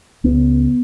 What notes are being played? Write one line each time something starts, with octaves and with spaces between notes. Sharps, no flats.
C#2 C#3 B3